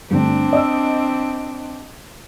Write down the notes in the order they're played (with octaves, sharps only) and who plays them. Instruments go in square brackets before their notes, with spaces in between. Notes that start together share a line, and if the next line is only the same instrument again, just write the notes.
[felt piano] G2 D3 A3 [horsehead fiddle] C4 D4
[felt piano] D#5 E6